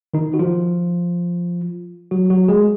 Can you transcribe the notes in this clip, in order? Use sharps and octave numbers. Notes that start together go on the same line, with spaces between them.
D#3 D#4
F#4
F3 F4
F#3 F#4
F#3 F#4
G#3 G#4